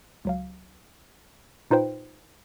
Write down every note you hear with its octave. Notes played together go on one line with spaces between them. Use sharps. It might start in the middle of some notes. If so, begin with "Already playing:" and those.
C#2 F#3 F5
A#2 D#4 F4 B4 C5 G5